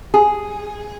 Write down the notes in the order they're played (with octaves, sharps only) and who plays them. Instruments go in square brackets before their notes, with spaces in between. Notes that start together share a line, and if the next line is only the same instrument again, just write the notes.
[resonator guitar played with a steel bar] G#4